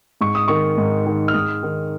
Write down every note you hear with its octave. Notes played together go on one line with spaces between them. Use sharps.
G#2 C#6
D#6
D#3 C#6
G#2
D#3
F6
G#2 D#6
D#3